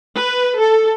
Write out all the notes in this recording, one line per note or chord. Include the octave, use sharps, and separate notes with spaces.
B4
A4